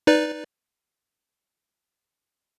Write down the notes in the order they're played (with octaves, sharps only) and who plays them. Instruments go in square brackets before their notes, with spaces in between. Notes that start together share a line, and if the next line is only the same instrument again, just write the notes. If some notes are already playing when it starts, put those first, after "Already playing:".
[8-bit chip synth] D#4 B4 D5